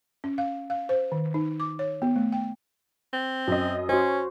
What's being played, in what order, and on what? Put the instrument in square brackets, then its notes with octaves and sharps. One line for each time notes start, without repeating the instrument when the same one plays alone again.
[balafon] C#4
F5
F5
C5
D#3
D#4
D6
C#5
B3
A3
G5
[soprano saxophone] C4
[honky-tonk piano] F#2 D#5
[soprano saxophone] C#4 [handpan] F#4 C5